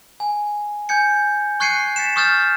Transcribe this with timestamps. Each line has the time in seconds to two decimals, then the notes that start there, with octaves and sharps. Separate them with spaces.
0.20 G#5
0.89 G#5 G6 G#6 C#7
1.60 C#6 F#6 G#6 C7 C#7 D#7
1.96 A6 B6 C#7 E7
2.16 C#6 D#6 F6 G6 A6